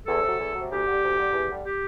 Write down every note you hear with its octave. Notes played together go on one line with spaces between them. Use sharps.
E2 A4
C3 F#3
E2
C3 F#3
D2 G4
D3 G3
D2
D3 G3
E2
D3 G3
G4